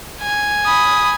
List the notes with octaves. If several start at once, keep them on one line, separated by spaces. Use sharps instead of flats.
G#5
B5 D#6